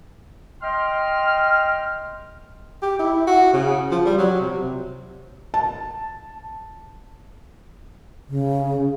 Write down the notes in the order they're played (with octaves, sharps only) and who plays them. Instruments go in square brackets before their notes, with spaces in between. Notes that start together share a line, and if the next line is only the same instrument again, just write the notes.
[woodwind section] D#5 G5 C6 F6
[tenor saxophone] G4
E4
F#4
C#3
F3
G3
F#3
C3
[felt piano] A5
[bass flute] C#3